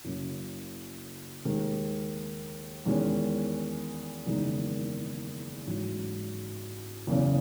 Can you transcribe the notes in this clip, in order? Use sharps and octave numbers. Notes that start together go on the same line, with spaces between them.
F#1 F#2 C#3 F#3
D#2 D#3 G#3
E2 D#3 G#3 C#4
F#1 E2 D#3 G#3 D#4
A1 G#2 F#3
F#1 E2 C#3